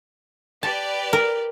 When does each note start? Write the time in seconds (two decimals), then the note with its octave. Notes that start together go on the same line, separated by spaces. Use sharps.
0.63 G4 B4 D5 A5
1.13 A#4